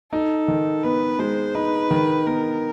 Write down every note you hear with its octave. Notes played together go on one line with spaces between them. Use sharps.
D#4 A4
D#3
B3 B4
G#3 C5
D#4 B4
D#3
B3 A#4